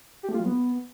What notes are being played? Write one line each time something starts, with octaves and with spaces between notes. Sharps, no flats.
G4
A3
F4
F#3
B3